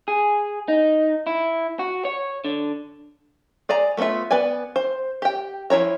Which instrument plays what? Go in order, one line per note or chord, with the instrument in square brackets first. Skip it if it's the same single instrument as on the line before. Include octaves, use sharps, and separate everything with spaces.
[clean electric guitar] G#4
D#4
E4
F#4
C#5
D3
[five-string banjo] G#4 D5 G#5 A#5
A3 B3 D#4 F4 E5
B3 B4 D5 G#5
C5
G4 G5
F3 E4 C#5 A#5